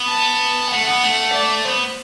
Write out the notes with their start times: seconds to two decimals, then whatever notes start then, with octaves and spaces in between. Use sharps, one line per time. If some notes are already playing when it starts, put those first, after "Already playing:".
Already playing: B3
0.09 A5
0.72 A3 F#5
0.87 B3
1.03 A3
1.34 D5
1.65 B3 C5